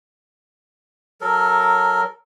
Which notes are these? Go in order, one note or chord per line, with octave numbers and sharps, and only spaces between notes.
F#3 A4 A#4